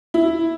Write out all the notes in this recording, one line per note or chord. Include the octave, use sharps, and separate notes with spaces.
E4